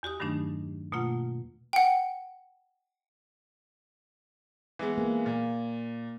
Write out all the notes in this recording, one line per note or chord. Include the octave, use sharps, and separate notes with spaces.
E2 F#4 G4 D#6
G2 D#3 F#3 A3 D4 D#4
B2 A3 A#3 F4 F#5
F#5 G5
E3 G#3 B3
A#3
A#2